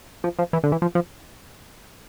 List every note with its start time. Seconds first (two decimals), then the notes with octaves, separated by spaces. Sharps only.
0.24 F3
0.39 F3
0.53 E3
0.63 D3
0.72 E3
0.82 F3
0.95 F3